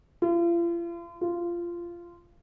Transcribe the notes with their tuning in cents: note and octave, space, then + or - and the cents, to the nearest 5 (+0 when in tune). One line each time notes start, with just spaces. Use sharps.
F4 -40
F4 -15